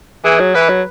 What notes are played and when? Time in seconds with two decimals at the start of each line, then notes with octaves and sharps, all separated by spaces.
0.24 E3 G#4
0.39 F#3
0.55 E3 B4
0.69 F#3